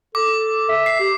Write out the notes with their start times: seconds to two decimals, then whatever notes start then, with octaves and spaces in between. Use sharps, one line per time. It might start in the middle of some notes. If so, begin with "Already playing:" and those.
0.15 A4 D6
0.69 E5
0.86 C7
1.00 G4